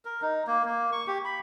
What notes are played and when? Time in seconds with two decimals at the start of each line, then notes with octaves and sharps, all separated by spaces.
0.05 A#4
0.22 D#4
0.47 A#3
0.65 A#3
0.92 C#6
1.07 G4
1.25 B5